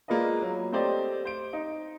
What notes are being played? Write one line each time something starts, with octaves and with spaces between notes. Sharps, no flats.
G#3 A#3 F4 B4 D5 D#5
F#3
A3 C4 G4 C5 D5 D#5
C5 D7
D#4